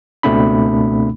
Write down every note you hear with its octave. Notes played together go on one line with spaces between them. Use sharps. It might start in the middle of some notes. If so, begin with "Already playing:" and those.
C#2 B2 A3 C4 D4 B5